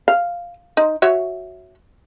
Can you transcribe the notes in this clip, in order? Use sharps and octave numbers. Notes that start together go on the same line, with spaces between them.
F5
D#4
F#4 C#5 E5